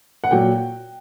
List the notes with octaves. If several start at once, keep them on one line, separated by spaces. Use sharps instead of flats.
F#5
A#2 F#3 G5